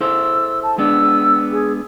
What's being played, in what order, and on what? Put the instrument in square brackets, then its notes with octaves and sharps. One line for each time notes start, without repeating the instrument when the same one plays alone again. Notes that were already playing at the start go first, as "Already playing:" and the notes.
[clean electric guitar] E4 A4 C5 [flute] E6
[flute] A5
[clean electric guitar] G#3 B3 D4 [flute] E6
[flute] G#4